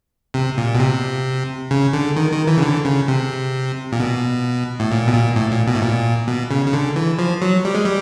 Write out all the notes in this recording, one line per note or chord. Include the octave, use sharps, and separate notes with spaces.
C3
A#2
B2
C3
C#3
D3
D#3
D#3
E3
C#3
D3
C#3
C3
A#2
B2
A2
A#2
B2
A#2
A2
A#2
B2
A2
A#2
B2
C#3
C#3
D3
E3
F3
F#3
G3
G#3
G3